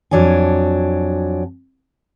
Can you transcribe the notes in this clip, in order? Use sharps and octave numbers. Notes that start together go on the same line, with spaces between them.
F2 F#3 D4 F#4 G#5